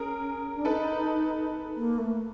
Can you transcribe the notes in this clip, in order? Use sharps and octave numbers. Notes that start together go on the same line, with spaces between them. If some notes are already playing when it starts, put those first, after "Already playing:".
Already playing: C#4 G#4 A#4
D4
D#4 A4 B4
A#3
A3